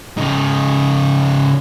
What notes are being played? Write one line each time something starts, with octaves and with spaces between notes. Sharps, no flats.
C#3 D#4